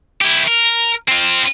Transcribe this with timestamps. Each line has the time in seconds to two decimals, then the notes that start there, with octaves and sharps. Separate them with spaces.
0.21 E4 G4
0.47 A#4
1.08 C4 F4